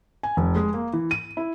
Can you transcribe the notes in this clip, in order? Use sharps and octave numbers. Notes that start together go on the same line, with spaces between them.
G#5
F1
G#3
A#3
E3
D#7
E4